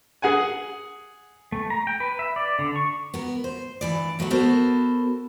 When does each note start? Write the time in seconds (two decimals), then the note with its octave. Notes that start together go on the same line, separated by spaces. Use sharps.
0.22 G#4 F#5 G#5
1.52 A3
1.70 A#5
1.87 G5
2.00 B4
2.19 E5
2.36 D5
2.59 D3
2.76 C#6
3.14 B3 A#4
3.44 C5
3.81 G2 E3 D5
4.19 D#2 F#3 A3 C#5 F#5
4.30 B3 F#4 A4 A#4 C5